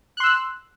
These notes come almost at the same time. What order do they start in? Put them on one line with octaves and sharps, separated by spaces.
F#6 C6 E6